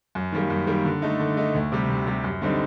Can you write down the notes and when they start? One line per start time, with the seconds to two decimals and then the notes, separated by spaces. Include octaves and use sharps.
0.15 F#2
0.32 D#3 G3 A#3
0.50 F#2
0.67 D#3 G3 A#3
0.85 D3
1.02 A3 D#4
1.20 D3
1.37 A3 D#4
1.55 D2
1.72 C3 G3
1.89 D2
2.06 C3 G3
2.24 F#2
2.42 D3 G3 C4 D#4